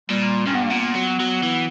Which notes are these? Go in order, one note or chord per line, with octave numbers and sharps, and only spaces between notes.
A#2 G3
G2 C#4
B3
A#3
A#2 B3
F#3
F#3
E3